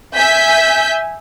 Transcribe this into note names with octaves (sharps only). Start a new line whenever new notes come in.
E5 G#5 G6 B6